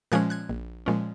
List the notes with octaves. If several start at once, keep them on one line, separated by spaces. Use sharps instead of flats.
A#2 F3 G#3 C#4 F#6 G#6
F#6 G#6
A#1
A#2 F3 G#3 C#4